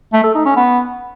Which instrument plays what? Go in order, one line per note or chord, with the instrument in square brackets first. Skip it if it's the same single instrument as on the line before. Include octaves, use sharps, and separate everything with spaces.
[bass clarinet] A3
A4
D#4
C#4
B3